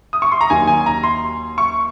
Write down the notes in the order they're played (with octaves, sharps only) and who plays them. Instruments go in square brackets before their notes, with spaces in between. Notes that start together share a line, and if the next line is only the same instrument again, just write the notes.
[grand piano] D#6
C#6
C6
A#5
D#2 D#3 F#3 G#5
G#5
A#5
C6
C#6